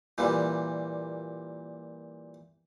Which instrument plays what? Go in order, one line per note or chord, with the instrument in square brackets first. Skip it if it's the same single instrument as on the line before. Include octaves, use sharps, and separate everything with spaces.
[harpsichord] A#2 E3 G3